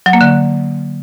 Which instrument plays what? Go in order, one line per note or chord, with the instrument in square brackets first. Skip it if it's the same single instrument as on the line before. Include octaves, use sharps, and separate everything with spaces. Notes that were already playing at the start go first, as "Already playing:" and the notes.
[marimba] F#3
A#3
D3